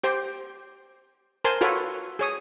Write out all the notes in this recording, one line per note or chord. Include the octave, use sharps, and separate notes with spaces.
G4 C5 G5
A#4 C5 G#5 A5 C6
F4 F#4 A4 B4 C#5 F5
G#4 C#5 D#6